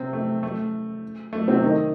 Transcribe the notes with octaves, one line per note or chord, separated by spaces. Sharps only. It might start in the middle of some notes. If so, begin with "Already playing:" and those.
Already playing: C3 C4
A3
A3
A3
C3 C4
D#3 D#4